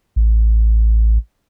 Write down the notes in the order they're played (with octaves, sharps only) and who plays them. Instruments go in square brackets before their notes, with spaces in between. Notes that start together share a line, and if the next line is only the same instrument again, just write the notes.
[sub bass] A1